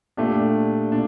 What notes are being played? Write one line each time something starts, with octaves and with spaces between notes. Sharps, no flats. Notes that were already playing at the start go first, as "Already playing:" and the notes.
A#2 A3 D4 G4
A#2 D4